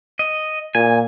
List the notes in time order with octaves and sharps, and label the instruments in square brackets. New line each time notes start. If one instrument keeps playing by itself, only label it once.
[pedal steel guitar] D#5
[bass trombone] A#2 [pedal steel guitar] G#5